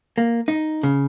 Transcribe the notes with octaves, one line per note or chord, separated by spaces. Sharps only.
A#3
D#4
C#3